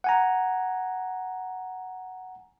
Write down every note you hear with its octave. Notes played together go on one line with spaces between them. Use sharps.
F#5 G#5 A#5